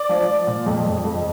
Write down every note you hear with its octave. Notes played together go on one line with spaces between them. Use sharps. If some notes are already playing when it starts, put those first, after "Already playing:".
Already playing: D5
F3
F3
A#2
F2
F2
F2